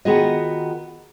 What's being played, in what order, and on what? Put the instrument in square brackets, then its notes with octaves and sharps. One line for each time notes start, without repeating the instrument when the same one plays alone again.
[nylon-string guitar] D#3 B3 F4 F#4 G#4 D#5